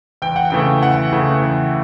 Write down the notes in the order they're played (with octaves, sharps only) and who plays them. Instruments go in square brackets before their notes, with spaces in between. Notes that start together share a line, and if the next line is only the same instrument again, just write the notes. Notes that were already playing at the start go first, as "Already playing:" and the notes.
[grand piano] E2 G5
F#5
C#3 E3 A3 G5
E2 F#5
C#3 E3 A3
E2